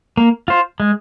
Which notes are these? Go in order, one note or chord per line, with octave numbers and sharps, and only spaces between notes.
A#3
F4 C5
G#3